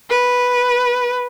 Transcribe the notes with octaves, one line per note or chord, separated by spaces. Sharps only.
B4